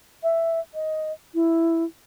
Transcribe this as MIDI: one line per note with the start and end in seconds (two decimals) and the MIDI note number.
0.23 0.60 76
0.74 1.12 75
1.34 1.84 64